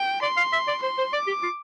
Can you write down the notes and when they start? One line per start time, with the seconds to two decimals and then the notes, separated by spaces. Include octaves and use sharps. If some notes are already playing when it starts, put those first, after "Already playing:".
Already playing: G5
0.22 D5 C6
0.37 F5
0.53 E5
0.68 D5
0.82 C5 C6
0.98 C5
1.13 D5 D6
1.27 G4
1.43 F4